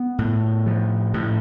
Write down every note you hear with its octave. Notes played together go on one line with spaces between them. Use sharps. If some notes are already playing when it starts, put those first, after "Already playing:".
Already playing: B3
A2
F3
A2